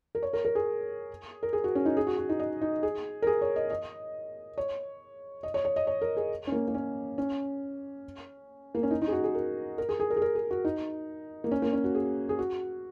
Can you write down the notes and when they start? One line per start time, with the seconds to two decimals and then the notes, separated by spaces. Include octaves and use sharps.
0.15 A#4
0.23 C#5
0.33 A#4
0.45 A#4
0.55 G#4
1.43 A#4
1.53 G#4
1.64 F#4
1.75 C#4
1.86 D#4
1.97 G#4
2.07 F#4
2.18 F#4
2.29 D#4
2.39 D#5
2.61 D#4
2.83 G#4
3.22 A#4
3.27 G#4
3.41 C#5
3.56 D#5
3.70 D#5
4.58 C#5
5.43 D#5
5.54 C#5
5.65 C#5
5.76 D#5
5.87 C#5
6.02 A#4
6.17 G#4
6.47 C#4
6.52 A#3
6.68 A#3
6.74 C#4
7.18 C#4
8.75 A#3
8.83 C#4
8.91 D#4
9.02 D#4
9.08 G#4
9.12 F#4
9.24 G#4
9.35 A#4
9.78 A#4
9.89 G#4
10.00 G#4
10.10 A#4
10.16 G#4
10.22 A#4
10.35 G#4
10.51 F#4
10.65 D#4
11.44 A#3
11.51 C#4
11.62 A#3
11.73 C#4
11.84 F#4
11.95 G#4
12.29 G#4
12.39 F#4